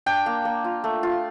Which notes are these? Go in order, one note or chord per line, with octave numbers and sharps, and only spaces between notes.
D4 G5
A#3
A#3
F4
A3
F4